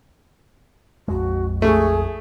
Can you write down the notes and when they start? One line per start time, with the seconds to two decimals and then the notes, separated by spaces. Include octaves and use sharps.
1.08 A#1 F2 G#3 F#4
1.62 A3 G#4 C#6